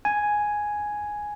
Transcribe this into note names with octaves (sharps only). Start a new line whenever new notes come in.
G#5